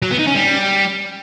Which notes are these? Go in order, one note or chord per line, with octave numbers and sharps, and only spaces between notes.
F#3
B3
D#4
C#4
G3